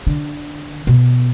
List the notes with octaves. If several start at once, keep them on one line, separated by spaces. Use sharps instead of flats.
D3
B2